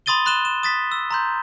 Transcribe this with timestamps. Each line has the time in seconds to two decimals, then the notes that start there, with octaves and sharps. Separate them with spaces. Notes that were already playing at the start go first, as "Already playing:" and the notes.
0.06 B5 C6 D#6 A6 D#7 G7
0.25 B5 C6 F#6 D#7 E7 G7
0.45 E7
0.63 D#6 A6 B6
0.92 E6
1.11 A#5 C6 G6